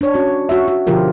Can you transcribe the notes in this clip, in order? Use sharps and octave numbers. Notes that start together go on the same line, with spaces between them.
D4 C#5
C#4 F#4
F#4 E5
F#4
B2 D3 F3 F4 G4 A#4